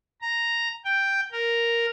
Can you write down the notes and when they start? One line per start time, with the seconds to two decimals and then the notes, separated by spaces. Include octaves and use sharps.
0.21 A#5
0.85 G5
1.32 A#4